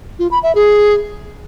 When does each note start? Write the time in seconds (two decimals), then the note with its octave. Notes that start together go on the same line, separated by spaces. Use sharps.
0.19 F4
0.31 B5
0.43 E5
0.55 G#4